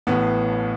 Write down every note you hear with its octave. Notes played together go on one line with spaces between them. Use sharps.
A1 A2 B3